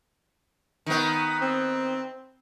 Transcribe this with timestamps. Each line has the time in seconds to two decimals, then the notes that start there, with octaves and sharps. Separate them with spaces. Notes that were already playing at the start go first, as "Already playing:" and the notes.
0.86 D#3 B3
1.42 C4